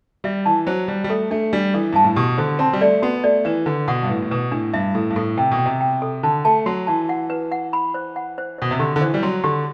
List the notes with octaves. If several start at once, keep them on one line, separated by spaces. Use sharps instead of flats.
G3 E5
E3 A5
F#3 C5
G3 C5
G3
A3 A4
A3 D4
G3 D4
E3 A4
G2 A5
A2
B2 G4
D3 C5
C4 A5
G3
A3 D5
B3 F#4
A3 D5
E3 B4
D3 B4
B2 F#5
G2
A2 B4
A2
B2 B4
A2 D4
G2 E5
A2 A4
G2
A2 A4
C3 G5
B2
G5
C3
G5
A4
D3 A5
A3 A5
F#3 F#4
E3 A5
F#5
B4
F#5
B5
C5
F#5
C5
B2 C5
C3
D3 G4
D3
E3 C5
G3
F#3 C6
D3 G4